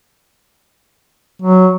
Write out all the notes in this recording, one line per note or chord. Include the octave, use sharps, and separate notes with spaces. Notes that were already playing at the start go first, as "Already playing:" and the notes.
F#3